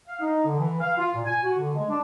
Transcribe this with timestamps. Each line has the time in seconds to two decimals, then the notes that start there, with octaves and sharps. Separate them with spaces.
0.07 F5
0.20 D#4
0.45 D3
0.59 E3
0.80 F5
0.98 F4
1.14 A#2
1.25 G#5
1.44 F#4
1.58 D3
1.75 G#3
1.90 D4